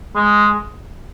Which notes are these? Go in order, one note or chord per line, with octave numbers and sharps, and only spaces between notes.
G#3